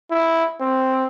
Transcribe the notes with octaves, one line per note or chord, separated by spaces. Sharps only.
E4
C4